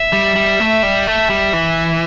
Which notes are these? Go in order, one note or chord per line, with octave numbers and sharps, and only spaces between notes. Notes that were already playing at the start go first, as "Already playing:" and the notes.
Already playing: E5
G3
G3
A3
G3
A3
G3
E3